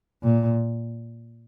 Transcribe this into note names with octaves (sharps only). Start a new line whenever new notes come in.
A#2